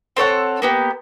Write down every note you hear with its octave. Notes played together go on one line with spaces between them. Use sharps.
C4 A4 C#5 F#5
A#3 B3 G4